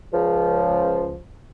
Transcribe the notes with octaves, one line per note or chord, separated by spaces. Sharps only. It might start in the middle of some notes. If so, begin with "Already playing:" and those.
C#2 F3